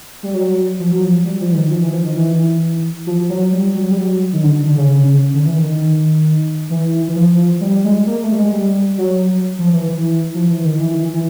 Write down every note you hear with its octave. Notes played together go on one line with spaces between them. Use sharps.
G3
F#3
F3
F#3
F3
G3
F3
E3
D#3
F3
E3
F3
D#3
E3
F3
F3
F#3
G3
F#3
G3
F#3
D#3
D3
D3
D3
C#3
C#3
C#3
D3
E3
D#3
E3
E3
F3
G3
G#3
A#3
A3
G3
G#3
G3
F#3
F3
E3
E3
F3
E3
D#3
E3
E3
E3
E3